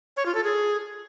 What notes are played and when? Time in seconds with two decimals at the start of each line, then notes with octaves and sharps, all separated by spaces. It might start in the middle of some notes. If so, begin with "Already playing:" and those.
0.17 C#5
0.26 F4
0.35 A4
0.44 G#4